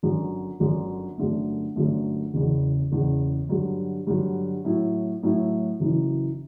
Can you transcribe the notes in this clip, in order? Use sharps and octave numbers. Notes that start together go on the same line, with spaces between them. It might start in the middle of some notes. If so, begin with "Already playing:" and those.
G1 F#2 D3
G1 F#2 D3
G1 F#2 D3 A3
G1 F#2 D3 A3
F#1 E2 C#3
F#1 E2 C#3
G2 D3 F#3
G2 D3 F#3
A2 F#3 A3 E4
A2 F#3 A3 E4
F#1 F#2 E3